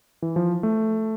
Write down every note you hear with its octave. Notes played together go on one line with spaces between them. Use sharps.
E3
F3
A3